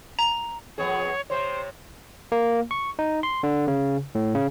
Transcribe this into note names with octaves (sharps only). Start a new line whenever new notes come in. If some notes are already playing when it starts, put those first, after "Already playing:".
A#5
F2 B3 G#4 C#5
C3 C4 C5 C#5
A#3
C#6
D#4
C6
D3
C#3
A2
C#3